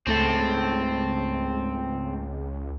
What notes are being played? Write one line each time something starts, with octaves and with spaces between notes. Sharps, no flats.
C#2 G#2 A3 C4 A4